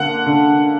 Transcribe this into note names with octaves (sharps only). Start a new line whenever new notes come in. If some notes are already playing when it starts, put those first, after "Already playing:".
Already playing: D3 A#3 F#5
D3